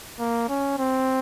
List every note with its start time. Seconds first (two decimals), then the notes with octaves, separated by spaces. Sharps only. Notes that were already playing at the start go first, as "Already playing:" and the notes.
0.19 A#3
0.49 C#4
0.78 C4